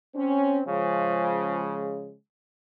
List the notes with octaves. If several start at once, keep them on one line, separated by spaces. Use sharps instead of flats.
C4 C#4
C#3 F3 G#3